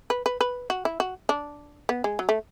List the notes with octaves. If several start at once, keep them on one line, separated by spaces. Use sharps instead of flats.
B4
B4
B4
F#4
E4
F#4
D4
B3
G#3
F#3
A3